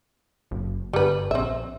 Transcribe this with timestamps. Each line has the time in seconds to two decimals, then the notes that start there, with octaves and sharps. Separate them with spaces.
0.51 F#1
0.93 G1 G3 B4
1.31 A#1 C4 E5